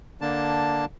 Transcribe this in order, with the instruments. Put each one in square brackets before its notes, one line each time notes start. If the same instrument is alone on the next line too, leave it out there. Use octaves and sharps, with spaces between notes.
[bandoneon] D3 A#3 D4 A5